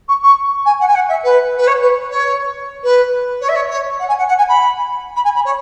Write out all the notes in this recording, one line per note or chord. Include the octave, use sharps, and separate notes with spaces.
C#6
C#6
G#5
F#5
G#5
F#5
E5
B4
B4
C#5
B4
C#5
B4
C#5
E5
C#5
C#5
F#5
G#5
F#5
F#5
G#5
B5
B5
G#5
B5
C#5